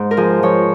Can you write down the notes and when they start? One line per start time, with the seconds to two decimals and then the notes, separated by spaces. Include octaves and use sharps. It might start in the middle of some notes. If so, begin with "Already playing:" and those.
Already playing: G#2
0.11 A#4
0.17 F3 G#4
0.43 F3 C#5